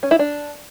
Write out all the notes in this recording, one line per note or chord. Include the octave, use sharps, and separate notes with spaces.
C#4
E4
D4